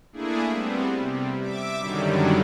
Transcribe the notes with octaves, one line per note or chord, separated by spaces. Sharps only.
A3 A#3 D4 E4 G#4
G3 B3 C4
C3 G3
E5 D6
F#2 D3 D#3 F#3 G3